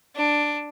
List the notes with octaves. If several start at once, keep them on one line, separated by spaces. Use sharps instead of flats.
D4